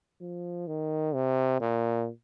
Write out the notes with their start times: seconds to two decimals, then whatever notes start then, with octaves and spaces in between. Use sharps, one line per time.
0.21 F3
0.67 D#3
1.15 C3
1.61 A#2